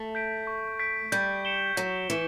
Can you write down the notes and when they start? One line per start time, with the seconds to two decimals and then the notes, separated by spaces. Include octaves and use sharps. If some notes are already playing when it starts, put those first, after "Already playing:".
Already playing: A3
0.15 G6 B6 D7
0.47 C#6
0.79 G6 B6 D7
1.12 G3 G6
1.45 C#7 E7 G7
1.77 F#3 G6
2.10 E3 C#7 E7 G7